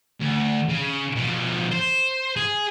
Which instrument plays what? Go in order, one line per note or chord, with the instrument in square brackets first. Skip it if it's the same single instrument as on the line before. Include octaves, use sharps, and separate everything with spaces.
[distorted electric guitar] D2
C#3
B2 F3
C5
G#4